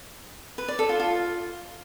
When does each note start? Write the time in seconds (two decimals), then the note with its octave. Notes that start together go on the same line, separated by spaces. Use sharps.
0.58 B4
0.68 D5
0.79 A4
0.89 F4
1.00 F4